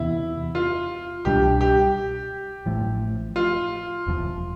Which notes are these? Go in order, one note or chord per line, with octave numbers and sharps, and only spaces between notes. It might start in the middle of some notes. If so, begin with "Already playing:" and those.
Already playing: E2 C3 E3 B3 E4
F4
C2 B2 G3 D4 G4
G4
A1 A2 F3 A3
F4
E1 E2 C3 F3